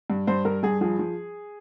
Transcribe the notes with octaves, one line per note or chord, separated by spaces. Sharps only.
G2
G2 C5
G2 A#4
G2 G#4
F3 G#4
F3